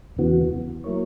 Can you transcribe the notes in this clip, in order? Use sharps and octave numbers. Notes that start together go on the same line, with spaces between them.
E2 C#3 E3 B3 F#4
F#3 A#3 E4 A#4 C#5